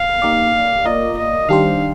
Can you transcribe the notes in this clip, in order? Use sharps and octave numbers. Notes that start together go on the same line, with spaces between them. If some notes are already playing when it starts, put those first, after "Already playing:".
Already playing: F5
A#3 D#4 G4 D5
A#3 F4 A#4 D5 D#5
D#5
D#3 G3 D4 G4 C5 F5